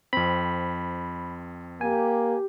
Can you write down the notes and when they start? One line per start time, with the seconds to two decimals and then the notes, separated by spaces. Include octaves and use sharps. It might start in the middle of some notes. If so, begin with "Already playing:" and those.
0.13 F2 C4 B5
1.81 A#3 G4 G#5